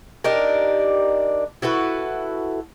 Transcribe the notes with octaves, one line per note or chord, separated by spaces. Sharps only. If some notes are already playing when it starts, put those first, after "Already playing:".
D4 D#4 G4 A#4
E4 F#4 A4 B4